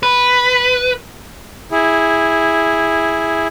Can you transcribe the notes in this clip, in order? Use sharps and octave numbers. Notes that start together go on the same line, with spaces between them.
B4
E4 G#4